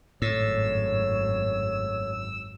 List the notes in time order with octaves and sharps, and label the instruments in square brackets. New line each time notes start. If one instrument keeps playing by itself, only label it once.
[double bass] G#1 F#2 [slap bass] A2 [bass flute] C#5 [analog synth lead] E6